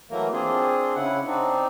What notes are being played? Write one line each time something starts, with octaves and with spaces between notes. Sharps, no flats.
E3 F#3 A3 A#3 A#4
C4 D4 F4 G#4
C#3 E4 F#5
C4 D4 D#4